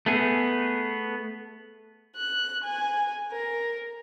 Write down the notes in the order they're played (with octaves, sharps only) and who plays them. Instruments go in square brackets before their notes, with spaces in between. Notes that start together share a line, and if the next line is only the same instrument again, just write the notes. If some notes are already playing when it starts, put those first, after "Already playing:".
[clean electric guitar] A3 B3 G#4
[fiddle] F#6
G#5
A#4